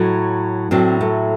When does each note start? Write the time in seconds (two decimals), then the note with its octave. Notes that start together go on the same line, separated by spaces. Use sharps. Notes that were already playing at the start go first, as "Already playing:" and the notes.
Already playing: A2 F#3
0.71 A2 F#3 C4 D4
1.01 A3